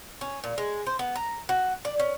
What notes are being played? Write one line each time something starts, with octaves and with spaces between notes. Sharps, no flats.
C#4
A#2
G#3
C5
B3
A#5
F#4
D5
C#4